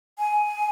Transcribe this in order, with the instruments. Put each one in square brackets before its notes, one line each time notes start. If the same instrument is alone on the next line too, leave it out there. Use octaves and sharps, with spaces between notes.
[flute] G#5